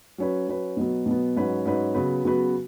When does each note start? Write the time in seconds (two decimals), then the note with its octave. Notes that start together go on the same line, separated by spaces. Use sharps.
0.18 F#3 C#4 B4
0.48 F#3 C#4 B4
0.77 B2 F#3 B3
1.06 B2 F#3 B3
1.36 G#2 F#3 C#4 B4
1.66 G#2 F#3 C#4 B4
1.95 C#3 F#3 B3 F#4 B4
2.24 C#3 F#3 B3 F#4 B4